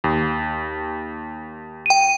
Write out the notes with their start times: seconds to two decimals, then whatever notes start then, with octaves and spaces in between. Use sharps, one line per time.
0.04 D#2
1.86 G5 D#7